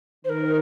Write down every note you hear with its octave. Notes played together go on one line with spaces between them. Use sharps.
D#3 A#4 C5